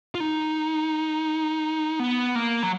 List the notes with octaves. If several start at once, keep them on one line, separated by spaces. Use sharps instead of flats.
F4
D#4
B3
A#3
F#3